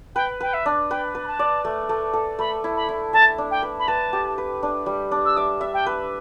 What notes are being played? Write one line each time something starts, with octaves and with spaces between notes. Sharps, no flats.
B4 G5
B4 G5
E5
D4
B4 G5
B4
B5
A5
D5
A3
A3
A4
A3 B5
E4
B5
E4
E5 A5
D4
G5
B4
B5
B4 A5
G4
B4
D4
G3
D4
E6
E5 D6
E5
G5
B4